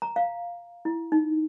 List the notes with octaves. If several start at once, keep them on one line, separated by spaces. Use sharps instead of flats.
A#5
F5
E4
D#4